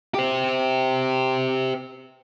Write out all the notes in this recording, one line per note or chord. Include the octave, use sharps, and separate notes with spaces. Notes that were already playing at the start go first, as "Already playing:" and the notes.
G4 C5